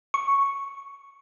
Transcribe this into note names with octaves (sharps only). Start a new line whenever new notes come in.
C#6